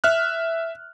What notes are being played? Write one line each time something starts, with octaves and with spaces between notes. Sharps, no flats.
E5 F6 F#6